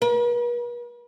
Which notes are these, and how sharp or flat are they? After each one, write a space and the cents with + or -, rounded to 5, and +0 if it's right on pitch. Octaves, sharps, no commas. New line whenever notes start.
B4 -45